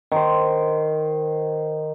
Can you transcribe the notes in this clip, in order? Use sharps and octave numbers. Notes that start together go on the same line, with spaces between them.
D#3 C5